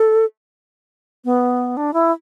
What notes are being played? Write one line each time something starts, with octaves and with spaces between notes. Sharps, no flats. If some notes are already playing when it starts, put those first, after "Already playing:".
Already playing: A4
B3
D4
E4